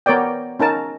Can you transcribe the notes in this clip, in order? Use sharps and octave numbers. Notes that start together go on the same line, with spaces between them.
B3 A#4 C#5 D5 G5
C#4 D#4 A#4 A5